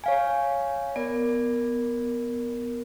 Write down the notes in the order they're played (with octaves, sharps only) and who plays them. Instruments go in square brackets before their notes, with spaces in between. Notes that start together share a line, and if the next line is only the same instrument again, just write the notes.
[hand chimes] C#5 F5 G#5
[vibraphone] B3 A#4 [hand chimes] D5